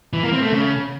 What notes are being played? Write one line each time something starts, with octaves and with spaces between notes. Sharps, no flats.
E3
A#3
C4
A3
C#3